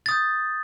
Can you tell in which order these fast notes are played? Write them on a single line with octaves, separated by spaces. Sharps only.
A6 D#6 G6